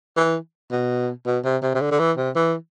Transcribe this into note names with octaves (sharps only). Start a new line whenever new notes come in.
E3
B2
B2
C3
C3
C3
D3
D3
E3
C3
E3